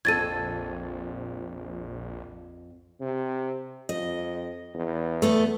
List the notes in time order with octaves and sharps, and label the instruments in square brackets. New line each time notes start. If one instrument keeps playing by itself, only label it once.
[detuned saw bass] A#1 [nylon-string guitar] F2 A4 [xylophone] G#6 A6 D#7
[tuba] C3
[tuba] F2 [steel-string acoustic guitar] D#5
[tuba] E2
[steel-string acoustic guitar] A3 B3 A4